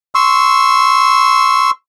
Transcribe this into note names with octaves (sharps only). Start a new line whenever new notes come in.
C6 C#6 E6